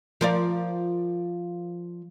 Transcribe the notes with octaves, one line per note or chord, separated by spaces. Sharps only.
F3 A#4 D5